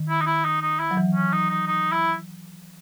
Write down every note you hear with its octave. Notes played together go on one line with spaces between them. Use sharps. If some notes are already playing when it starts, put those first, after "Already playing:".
Already playing: D#3
E4
D#4
E4
D#4
D#4
E4
F#3
E3
C#4
D#4
D#4
D#4
E4